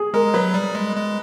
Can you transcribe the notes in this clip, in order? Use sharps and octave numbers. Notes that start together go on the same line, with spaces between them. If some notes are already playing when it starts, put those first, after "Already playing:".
Already playing: G#4
G#3 A#4
F#3 B4
G3
G#3
G#3